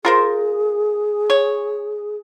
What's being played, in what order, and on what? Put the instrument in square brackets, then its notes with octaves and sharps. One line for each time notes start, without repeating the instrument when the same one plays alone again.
[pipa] F4 A#4 C5 [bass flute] G#4
[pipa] C#5